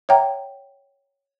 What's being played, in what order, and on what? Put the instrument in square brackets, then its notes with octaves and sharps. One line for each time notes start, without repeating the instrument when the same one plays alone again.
[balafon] C#5 E5 F#5 G5 A#5